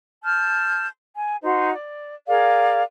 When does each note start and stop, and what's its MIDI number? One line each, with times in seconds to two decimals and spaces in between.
0.24 0.87 81
0.24 0.87 89
0.24 0.87 91
1.16 1.36 80
1.44 1.72 63
1.44 1.72 66
1.44 1.72 72
1.73 2.13 74
2.28 2.82 68
2.28 2.82 70
2.28 2.82 74
2.28 2.82 77